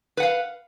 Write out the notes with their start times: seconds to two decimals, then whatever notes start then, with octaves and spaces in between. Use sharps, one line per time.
0.17 B4
0.20 F#5
0.23 F5